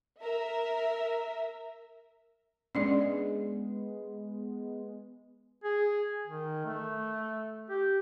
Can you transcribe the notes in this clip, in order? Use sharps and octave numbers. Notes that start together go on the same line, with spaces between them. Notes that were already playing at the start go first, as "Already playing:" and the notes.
A#4 E5
G#3 B3 C#4 D4 D5
G#4
D#3
A3
G4